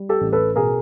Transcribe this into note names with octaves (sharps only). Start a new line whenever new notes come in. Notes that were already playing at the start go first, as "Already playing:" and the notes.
Already playing: G3
G4 A4
A1
A4 B4
B2 G#4 A#4